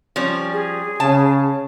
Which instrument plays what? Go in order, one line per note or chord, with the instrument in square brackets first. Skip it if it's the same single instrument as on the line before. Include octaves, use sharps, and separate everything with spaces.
[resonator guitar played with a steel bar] F3 G3 C#4
[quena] G#4
[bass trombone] C#3 [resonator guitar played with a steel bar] A5